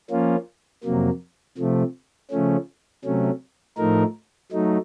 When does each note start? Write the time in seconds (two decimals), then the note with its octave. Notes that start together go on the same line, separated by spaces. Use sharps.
0.10 F3 A#3 C#4 F4
0.84 F2 C3 F#3 A#3
1.58 C3 F3 A3
2.31 C#3 F3 A3 C#4
3.05 C3 F#3 A3 C#4
3.78 A2 F3 A3 D#4 A#4
4.52 F#3 A3 D#4